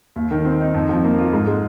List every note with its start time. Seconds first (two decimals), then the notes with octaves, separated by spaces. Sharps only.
0.16 D#2
0.31 D#3
0.45 C4
0.60 D#4
0.74 F2
0.89 F3
1.04 A#3
1.18 F4
1.33 G#2
1.47 G#3